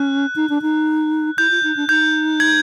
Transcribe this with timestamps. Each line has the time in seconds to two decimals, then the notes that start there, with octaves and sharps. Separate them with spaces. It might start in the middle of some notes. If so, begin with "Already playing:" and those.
Already playing: C#4 F#6
0.36 D#4
0.49 D4
0.62 D#4
1.38 E4 G6
1.51 F4
1.63 D#4
1.76 D4
1.89 D#4 G6
2.40 G#6